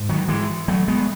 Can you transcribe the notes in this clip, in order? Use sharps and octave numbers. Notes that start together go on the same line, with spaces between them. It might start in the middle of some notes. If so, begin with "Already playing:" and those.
Already playing: G#2
D#3 F#3
E3 G#3
F#3 A3
G#3 B3